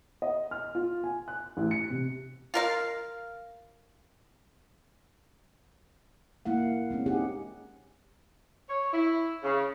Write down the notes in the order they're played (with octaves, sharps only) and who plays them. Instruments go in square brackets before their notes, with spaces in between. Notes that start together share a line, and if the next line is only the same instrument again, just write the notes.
[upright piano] D#5
F6
F4
G#5
F#6
A1
C#7
C3
[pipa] F4 A#4 F5
[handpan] A#3 E4 F5 F#5
G#3 C4 C#4
D#4 G4 G#4 F#5
[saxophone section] C#5
E4
C#3